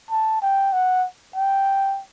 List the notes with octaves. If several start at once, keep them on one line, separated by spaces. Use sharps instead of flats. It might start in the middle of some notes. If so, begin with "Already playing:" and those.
A5
G5
F#5
G5